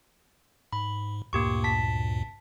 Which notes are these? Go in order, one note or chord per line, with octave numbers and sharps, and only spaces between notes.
G#2 B5
D2 G2 A#2 A#3 G4 C#6
A5 B6